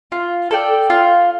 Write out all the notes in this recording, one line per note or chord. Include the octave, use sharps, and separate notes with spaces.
F4
A4 D5 G5
F4